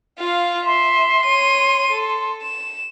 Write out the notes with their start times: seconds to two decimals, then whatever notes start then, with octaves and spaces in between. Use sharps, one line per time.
0.19 F4 F5
0.66 E5 C6
1.26 C#5 D#7
1.92 A4
2.42 E7